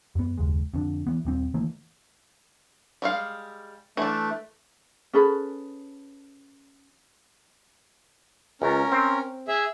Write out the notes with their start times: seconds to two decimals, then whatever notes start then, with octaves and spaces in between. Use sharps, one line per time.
0.15 F#2 B3
0.38 F#1 D#2 G#3
0.74 F2 D3
1.07 E3 B3
1.25 D#1 G3 C4
1.54 D#3 E3 A3 A#3
3.02 G3 G#3 F5
3.97 E3 A3 D4
5.13 C#4 G#4 A4 B4
8.62 C#2 C#4 A#4
8.92 C4
9.48 G#4 E5